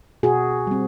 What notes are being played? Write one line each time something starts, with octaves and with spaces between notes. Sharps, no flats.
B2 F#4 G#4
G3 C4